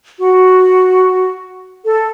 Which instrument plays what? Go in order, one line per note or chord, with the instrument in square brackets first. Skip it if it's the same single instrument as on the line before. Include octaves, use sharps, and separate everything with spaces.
[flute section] F#4
A4